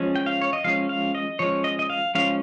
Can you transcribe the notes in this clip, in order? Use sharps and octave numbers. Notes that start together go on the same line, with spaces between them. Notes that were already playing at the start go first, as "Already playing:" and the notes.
Already playing: F3 G#3 C#4
G5
F5
C#5
D#5
F3 G#3 C#4 F5
F5
D#5
F3 G#3 C#4 C#5
D#5
D#5
F5
F3 G#3 C#4 F5